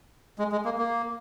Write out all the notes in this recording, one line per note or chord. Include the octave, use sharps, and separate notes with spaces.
G#3
G#3
A#3
A#3